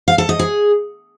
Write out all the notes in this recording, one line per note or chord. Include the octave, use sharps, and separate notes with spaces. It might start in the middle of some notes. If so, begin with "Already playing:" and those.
F5
A4
D#5
G#4